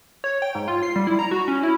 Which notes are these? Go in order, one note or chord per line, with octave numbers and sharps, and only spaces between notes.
C#5
G5
G#2
F4
C7
G3
E4
A#5
F#4
C#4
E4